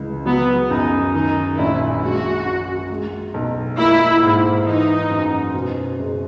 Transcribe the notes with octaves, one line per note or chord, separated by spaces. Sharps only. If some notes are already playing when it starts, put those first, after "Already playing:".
Already playing: C#2 E3
F#3 B3
F#2 D#4
D#3 D#4
A#1 E4
G#3 F#4
F#2
G#3
B1
A#3 E4
G#2
E3 D#4
F#2
B2
F#1